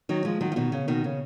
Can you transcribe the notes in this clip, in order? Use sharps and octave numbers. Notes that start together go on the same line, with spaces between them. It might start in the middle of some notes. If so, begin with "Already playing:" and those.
D#3 F#3
F3 G#3
D#3 F#3
F3
B2 D#3
C#3
B2 D#3
C#3